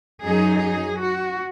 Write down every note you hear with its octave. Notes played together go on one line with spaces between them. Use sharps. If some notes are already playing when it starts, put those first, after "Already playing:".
F#2 F#3 D#4 G#4
G#4
F#4